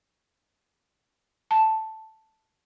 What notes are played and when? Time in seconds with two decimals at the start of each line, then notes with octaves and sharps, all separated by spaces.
1.51 A5